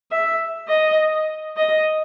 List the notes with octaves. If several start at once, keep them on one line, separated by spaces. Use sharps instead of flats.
E5
D#5
D#5